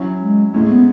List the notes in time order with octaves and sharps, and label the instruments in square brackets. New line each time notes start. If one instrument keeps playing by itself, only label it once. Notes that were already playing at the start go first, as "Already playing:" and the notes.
Already playing: [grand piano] F#3 C#4 E4
[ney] G#3
[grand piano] A2 G#3 C#4 E4 [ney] A3
[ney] B3